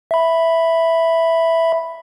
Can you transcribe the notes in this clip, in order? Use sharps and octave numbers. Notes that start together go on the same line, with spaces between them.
E5 B5